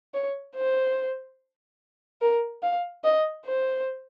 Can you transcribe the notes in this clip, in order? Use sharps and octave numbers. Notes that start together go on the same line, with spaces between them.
C#5
C5
A#4
F5
D#5
C5